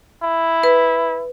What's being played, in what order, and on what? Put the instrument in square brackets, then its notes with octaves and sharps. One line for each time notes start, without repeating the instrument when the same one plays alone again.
[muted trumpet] E4
[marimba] B4